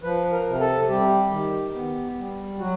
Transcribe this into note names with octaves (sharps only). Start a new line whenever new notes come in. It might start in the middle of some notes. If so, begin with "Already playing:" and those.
F3 B4
A#4
C3
A4
G3 G4
D#3
B3
G3
F#3 F#4